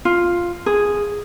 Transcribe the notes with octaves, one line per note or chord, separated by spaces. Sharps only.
F4
G#4